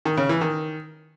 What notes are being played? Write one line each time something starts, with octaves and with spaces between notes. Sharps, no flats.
D#3
C#3
E3
D#3